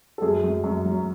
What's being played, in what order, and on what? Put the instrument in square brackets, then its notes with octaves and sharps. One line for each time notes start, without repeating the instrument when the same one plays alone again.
[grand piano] A4
F#2 G#4
F#2
F#2
F#3